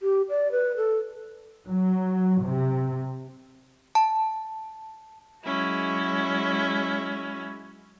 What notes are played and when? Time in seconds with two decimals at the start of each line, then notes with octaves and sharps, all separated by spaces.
0.01 G4
0.29 D5
0.52 B4
0.77 A4
1.66 F#3
2.43 C3
3.95 A5
5.44 F#3 G#3 C#4 E4 F#4